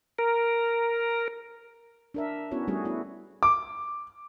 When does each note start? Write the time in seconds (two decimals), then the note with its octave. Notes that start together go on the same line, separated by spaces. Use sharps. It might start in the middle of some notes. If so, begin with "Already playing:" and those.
0.19 A#4
2.14 D4 A#4 E5
2.51 B3 C#4 E4 F#4 C#5
2.68 G3 A3 C#4 F#4 G#4
2.85 B3 E4 F#4
3.43 D6